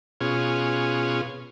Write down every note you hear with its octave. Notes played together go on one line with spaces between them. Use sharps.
B2 C#4 F4 G#4